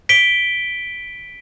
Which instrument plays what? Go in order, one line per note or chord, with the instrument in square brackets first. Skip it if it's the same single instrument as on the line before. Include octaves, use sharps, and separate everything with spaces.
[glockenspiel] B6 D7 G7